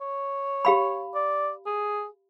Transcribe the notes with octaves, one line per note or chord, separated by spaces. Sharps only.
C#5
G4 F5 B5
D5
G#4